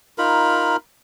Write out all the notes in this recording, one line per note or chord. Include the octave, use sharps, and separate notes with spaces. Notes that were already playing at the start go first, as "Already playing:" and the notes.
D#4 F4 A#4 B5